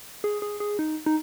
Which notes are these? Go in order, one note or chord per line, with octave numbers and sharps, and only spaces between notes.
G#4
G#4
G#4
D#4
D#4